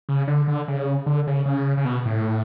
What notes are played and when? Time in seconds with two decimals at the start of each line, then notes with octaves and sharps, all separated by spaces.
0.09 C#3
0.28 D3
0.48 D3
0.68 C#3
1.06 D3
1.27 C#3
1.46 C#3
1.77 C#3
1.85 B2
2.05 A2